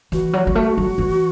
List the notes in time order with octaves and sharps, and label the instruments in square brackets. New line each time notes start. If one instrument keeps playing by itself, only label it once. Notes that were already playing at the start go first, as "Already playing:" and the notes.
[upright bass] E3 [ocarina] F#4
[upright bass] F#3
F#3
A3
F#3
E3